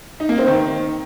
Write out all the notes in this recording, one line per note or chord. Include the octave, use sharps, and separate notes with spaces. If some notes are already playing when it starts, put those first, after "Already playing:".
D#4
A#3
C4
D#3